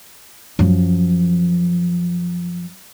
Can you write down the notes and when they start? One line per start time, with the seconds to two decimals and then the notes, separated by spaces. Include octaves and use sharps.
0.59 F#2 F3